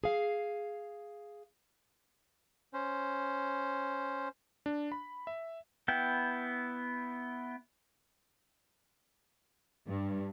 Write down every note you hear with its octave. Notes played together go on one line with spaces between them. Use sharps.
G#4 F5
C#4 C5
D4
B5
E5
B3 E4 G5
G2